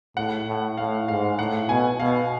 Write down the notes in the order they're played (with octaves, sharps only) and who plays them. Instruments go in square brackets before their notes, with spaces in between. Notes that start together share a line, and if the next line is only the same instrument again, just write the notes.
[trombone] A2 [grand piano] F#5
[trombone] A2
[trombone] A2 [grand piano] F5
[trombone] G#2 [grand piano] F5
[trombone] A2 [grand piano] F#5
[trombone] B2 [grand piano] G#5
[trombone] B2 [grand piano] F5